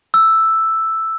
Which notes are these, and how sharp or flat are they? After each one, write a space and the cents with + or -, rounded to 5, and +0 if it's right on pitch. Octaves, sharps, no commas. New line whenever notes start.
E6 +0